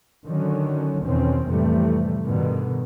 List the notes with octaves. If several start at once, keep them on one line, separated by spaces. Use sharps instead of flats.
D3 D#3 F#3 C#4
E2 B2 D#3 C4 C#4
F2 A2 C3 E3 G3 A3
G2 B2 D3 D#3